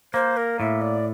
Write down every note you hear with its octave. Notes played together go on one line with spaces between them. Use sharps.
A#3 C5
A#4
A2 E5
D5